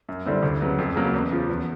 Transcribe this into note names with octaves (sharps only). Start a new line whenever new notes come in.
F#2
D3 G3 C4 E4
D2
C#3 F#3 B3
F2
C#3 F#3 A#3
E2
C#3 F3
E2